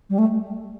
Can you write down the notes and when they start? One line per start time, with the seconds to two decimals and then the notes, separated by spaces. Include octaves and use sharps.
0.09 G3
0.18 A3